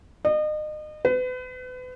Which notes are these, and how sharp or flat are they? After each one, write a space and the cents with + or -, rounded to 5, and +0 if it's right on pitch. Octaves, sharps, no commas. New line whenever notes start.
D#5 -35
B4 +35